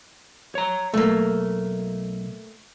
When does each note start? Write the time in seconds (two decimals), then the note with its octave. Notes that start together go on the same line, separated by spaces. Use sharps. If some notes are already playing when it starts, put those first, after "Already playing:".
0.55 C#5 A#5
0.94 B1 A3 A#3